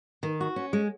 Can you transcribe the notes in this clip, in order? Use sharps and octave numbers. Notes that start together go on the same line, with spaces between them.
D#3
F#4
C#4
G#3